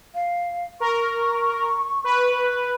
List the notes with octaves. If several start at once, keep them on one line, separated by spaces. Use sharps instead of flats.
F5
A#4 C#6
B4